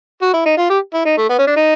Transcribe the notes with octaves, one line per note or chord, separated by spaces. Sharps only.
F#4
E4
D#4
F4
G4
E4
D#4
A3
B3
C#4
D4
D#4